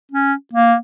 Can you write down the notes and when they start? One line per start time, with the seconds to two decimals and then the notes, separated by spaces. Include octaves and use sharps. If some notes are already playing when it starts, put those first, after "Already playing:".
0.12 C#4
0.53 A#3